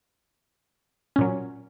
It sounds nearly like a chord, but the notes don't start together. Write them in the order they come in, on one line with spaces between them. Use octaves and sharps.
C#4 A#2 F#3